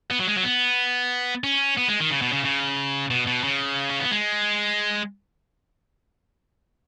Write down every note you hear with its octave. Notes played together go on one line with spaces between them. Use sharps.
B3
F#3
G#3
F#3
B3
C#4
B3
G#3
D#3
C#3
B2
C#3
C#3
B2
B2
C#3
C#4
B3
G#3